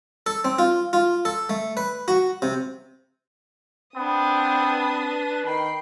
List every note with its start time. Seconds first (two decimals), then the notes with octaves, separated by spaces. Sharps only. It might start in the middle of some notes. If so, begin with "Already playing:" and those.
0.26 A4
0.45 C4
0.59 F4
0.93 F4
1.25 A4
1.50 A3
1.77 B4
2.08 F#4
2.42 C3
3.96 B3 C4 D4 D#6
4.55 B4
5.46 D#3 G5 B5 C7